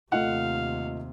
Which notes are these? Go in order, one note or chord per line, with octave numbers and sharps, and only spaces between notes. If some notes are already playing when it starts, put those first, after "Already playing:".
D#2 C3 A3 F4 D#5 F5 F#5